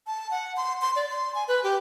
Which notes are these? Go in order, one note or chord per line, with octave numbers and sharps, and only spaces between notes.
A5
F#5
C6
C6
D5
C6
G#5
B4
G4